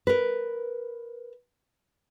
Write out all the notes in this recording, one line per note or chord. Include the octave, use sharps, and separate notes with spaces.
A#4 B4